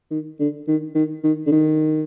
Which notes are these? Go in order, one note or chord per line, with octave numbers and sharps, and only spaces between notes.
D#3
D3
D#3
D#3
D#3
D3
D#3